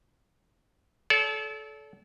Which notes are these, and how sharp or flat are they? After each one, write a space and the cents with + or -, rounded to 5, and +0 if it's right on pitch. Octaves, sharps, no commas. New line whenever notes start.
A4 -25 D5 -45